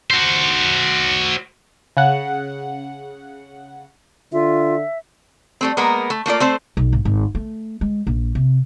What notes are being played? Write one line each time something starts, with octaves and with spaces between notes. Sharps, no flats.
F#4 C5
C#3 F#5
D3 F4 E5
G3 A3 C4
G#3 A#3 B3 A#4
A3
A3 A#3 F4 D5
A3 C4 C5
B1
G#1
G#1
A3
G#3
A#1
C3